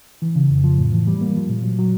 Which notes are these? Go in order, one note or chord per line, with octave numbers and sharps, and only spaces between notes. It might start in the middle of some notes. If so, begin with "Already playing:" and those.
E3
C#3
F2
F3
A2
E3
G3
A#3
F3
A#2
F#3
F#3